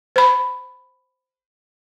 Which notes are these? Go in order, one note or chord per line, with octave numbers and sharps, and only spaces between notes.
C5 B5